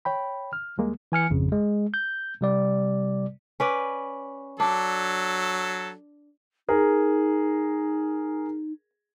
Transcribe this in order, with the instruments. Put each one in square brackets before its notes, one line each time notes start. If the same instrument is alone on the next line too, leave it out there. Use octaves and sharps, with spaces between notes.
[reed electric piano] C#5 G5 B5
F6
D#2 G3 G#3 A#3
[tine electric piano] E3 G#5 F6 C#7
G#1 F2 C#3
G#3
G6
C3 G3 D5
[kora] C#4 B4 D5
[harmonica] F#3 A4 [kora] D4
[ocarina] D#4 [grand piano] G#4 A#4